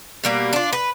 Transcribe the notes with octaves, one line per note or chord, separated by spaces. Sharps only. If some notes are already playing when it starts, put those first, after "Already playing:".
B2 G3 A#3
D4 F4
B4